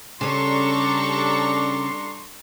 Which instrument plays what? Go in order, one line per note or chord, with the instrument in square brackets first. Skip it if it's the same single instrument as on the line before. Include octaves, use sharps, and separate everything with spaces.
[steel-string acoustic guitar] C#3 C#4 [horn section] G3 D4 [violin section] A4 A#5 C#6 [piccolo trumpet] C6